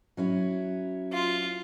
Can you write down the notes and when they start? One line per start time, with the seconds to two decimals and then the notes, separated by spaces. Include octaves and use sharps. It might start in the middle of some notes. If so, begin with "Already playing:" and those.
0.17 F#3 C#4 E4
1.13 F4